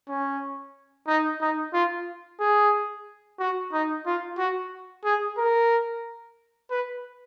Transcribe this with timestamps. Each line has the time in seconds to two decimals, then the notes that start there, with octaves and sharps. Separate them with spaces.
0.09 C#4
1.08 D#4
1.41 D#4
1.73 F4
2.40 G#4
3.39 F#4
3.73 D#4
4.06 F4
4.38 F#4
5.05 G#4
5.38 A#4
6.71 B4